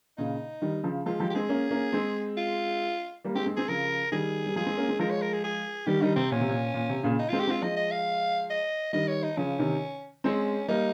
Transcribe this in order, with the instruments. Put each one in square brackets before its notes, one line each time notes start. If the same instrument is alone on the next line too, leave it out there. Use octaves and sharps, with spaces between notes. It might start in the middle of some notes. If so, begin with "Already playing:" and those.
[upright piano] A#2 C#3 [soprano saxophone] D#4
[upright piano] D#3 G3
C#3 F3
[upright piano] F3 G#3 [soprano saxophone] F4
[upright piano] F3 G#3 [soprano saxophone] G4
[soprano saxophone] G4
[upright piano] G#3 C4 [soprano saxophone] G#4
[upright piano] A#3 C#4
A#3 C#4
G#3 C4
[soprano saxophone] F4
[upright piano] G3 A#3
[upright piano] G#3 C4 [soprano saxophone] G4
[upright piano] G#3 C4
[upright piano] G#3 C4 [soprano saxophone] G#4
[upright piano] C#3 F3 [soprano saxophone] A#4
[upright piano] D#3 G3 [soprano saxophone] G#4
[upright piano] G3
[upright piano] F3 G#3 [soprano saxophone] G#4
[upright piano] G#3 C4
A#3 C#4
G#3 C4
[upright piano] F3 G#3 [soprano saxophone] A#4
[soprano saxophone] C#5
A#4
G#4
G#4
[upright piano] D#3 G3 [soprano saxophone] G4
[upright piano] D#3 G3 [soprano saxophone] D#4
[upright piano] C3 [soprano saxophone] C4
[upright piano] A#2 [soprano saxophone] C#4
[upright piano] C3
A#2
A#2
C3
A#2 C#3
[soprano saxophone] D#4
[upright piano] G#3 C4 [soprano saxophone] F4
[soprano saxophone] G4
[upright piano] G#3 C4 [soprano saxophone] F4
[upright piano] F3 G#3 [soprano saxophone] D#5
[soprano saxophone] D#5
F5
D#5
[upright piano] D#3 G3 [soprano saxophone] D#5
[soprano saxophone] C#5
D#4
[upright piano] C#3 F3 [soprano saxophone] C#4
[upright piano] C3 D#3
[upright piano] G#3 C4 [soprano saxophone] C#4
[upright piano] G3 A#3 [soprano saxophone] D#4